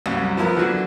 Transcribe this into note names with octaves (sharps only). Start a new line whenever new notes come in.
C2 F#2
F3 B3 E4 A#4
D3 E3 F#3